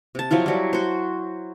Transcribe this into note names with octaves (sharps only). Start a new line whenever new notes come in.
C3 A5
F3 F#3 E4 F4
F#3 G3
F#4 C5